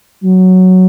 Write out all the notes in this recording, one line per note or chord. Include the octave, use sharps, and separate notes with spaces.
F#3